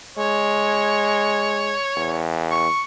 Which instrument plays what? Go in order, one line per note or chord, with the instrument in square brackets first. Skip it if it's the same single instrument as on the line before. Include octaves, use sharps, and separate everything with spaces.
[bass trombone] G#3 [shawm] C#5
[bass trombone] E2
[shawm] C#6